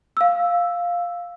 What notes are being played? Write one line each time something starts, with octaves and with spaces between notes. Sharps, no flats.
F5 E6